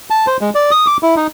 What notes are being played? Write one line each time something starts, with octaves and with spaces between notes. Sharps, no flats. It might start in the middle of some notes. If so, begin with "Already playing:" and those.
A5
C5
G#3
D5
D#6
D6
E4
D#4